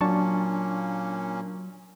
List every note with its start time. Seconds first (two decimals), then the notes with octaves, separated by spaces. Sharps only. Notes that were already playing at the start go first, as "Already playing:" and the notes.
0.01 A#2 F#3 A#3 C#4 D4 A5 C#6